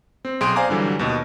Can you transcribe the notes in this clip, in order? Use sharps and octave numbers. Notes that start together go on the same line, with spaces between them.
C4
B1 G#4 G5 C6 D7
C5 D5 F5 G#5 A#5 D6
G2 D3 E3 F#3 G3
D#2 B2 D#5